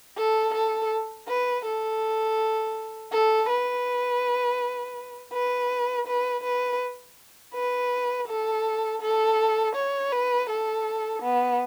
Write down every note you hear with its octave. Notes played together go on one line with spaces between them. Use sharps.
A4
A4
B4
A4
A4
B4
B4
B4
B4
B4
A4
A4
C#5
B4
A4
B3